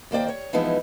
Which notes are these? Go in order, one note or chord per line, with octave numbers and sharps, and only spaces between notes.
D#2 A#3 C5 D5 G5
C#5
E3 F3 G#3 B3 D#4 E4